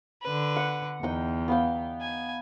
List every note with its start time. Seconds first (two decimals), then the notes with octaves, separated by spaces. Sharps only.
0.23 D3 B4
0.56 F#5
1.03 E2 D#4 G5
1.48 B3 F5 G5
2.03 G#5